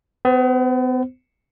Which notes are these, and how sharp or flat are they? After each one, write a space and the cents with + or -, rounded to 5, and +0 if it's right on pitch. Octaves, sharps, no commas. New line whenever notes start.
B3 +40 C5 +0